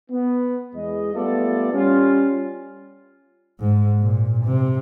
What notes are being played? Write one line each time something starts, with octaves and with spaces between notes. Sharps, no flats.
B3
E2 G#3 D#5
G3 A3 B3 F4 A4 D5
G3 C#4 F4
G#2
A#2
C3